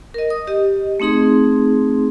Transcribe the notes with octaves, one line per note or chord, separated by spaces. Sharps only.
A#4 D#5
D#6
G4 D#5
A3 C4 D#4 G#4 C6